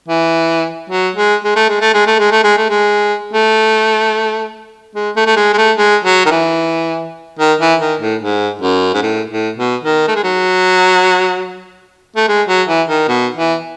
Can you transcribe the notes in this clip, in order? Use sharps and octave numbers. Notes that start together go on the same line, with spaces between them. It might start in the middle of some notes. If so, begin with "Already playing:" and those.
E3
F#3
G#3
G#3
A3
G#3
A3
G#3
A3
G#3
A3
G#3
A3
G#3
A3
G#3
A3
A3
G#3
G#3
A3
G#3
F#3
D#3
E3
D#3
E3
D#3
A2
G#2
F#2
G#2
A2
A2
B2
D#3
A3
G#3
F#3
A3
G#3
F#3
E3
D#3
B2
E3